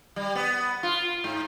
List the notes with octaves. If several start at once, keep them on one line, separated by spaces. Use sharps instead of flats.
G3
B3
F4
G#2